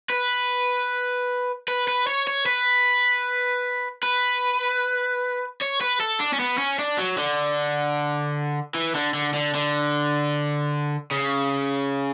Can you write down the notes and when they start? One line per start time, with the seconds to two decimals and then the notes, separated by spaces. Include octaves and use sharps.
0.10 B4
1.68 B4
1.88 B4
2.07 C#5
2.27 C#5
2.46 B4
4.03 B4
5.61 C#5
5.81 B4
6.00 A4
6.20 D4
6.33 C#4
6.40 B3
6.58 C#4
6.79 D4
6.98 F#3
7.17 D3
8.75 E3
8.95 D3
9.14 D3
9.34 D3
9.54 D3
11.11 C#3